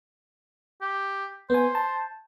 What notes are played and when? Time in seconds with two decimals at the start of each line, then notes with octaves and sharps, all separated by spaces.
0.82 G4
1.50 B3 C5 G#5
1.75 A5